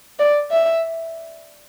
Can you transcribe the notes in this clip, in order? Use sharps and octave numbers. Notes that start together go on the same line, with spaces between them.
D5
E5